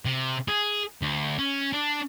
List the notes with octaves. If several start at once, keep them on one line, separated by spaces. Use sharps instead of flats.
C3
G#4
D2
C#4
D4